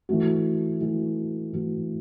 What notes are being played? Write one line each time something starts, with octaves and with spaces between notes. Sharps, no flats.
E3 A3 F#4
E3 A3 F#4
E3 A3 F#4